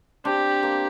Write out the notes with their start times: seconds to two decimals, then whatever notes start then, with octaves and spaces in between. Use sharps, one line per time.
0.25 C4 D4 G4
0.63 A#3 C4